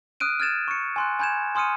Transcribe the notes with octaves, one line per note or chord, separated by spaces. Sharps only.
D#6 F6 F#6 D7 D#7
F6 G#6 A6 E7
C#6 C#7
G#5 C6 F#6
G#5 B5 G6 G#6 E7
G#5 C6 D#6 F6 C#7 D#7